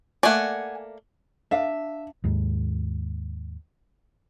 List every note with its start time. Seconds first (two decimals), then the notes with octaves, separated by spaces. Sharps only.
0.23 A3 A#3 D5 F#5 G#5
1.51 D4 E5 F5
2.24 D#2 G#2